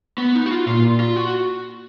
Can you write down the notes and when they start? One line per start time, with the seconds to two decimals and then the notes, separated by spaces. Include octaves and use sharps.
0.18 B3
0.35 D#4
0.46 F#4
0.51 F4
0.67 A#2 F4
1.00 F4
1.16 F#4